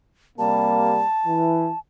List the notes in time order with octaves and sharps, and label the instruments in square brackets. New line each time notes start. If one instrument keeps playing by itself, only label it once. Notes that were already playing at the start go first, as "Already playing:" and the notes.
[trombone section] C3 G3 A#3 [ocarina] A5
[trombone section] E3